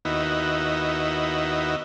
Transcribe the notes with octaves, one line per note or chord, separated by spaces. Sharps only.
D#2 B3 D#4 E4 F#4